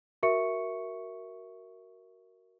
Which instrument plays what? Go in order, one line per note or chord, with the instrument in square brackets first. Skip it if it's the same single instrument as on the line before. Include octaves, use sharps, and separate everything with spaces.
[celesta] F#4 A#4 E5 C#6 C#7